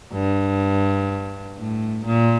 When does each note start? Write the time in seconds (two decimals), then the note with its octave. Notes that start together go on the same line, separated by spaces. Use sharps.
0.13 G2
1.56 A2
2.06 A#2